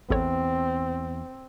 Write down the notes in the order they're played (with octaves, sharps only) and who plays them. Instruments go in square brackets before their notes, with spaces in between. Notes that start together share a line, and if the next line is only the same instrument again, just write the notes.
[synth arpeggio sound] A1 A4 C#5 [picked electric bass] E2 [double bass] C4